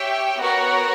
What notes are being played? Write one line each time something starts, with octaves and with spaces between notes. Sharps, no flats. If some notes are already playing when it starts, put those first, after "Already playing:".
Already playing: G4 C#5 E5 G5
B3 F#4 A#4 C#5 F#5